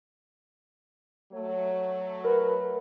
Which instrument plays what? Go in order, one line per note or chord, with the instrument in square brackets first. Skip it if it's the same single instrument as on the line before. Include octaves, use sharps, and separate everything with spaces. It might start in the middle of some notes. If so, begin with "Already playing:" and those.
[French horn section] F#3 A3 [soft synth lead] C#5
[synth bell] A#4 [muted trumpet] B4